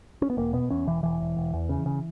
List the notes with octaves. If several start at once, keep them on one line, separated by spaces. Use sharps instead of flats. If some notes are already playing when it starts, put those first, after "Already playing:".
C#4
B3
E1 A#3
B2 B3
E2 C#4
E1 E3
E1 E3
E1
E1
E2
C#3
C#3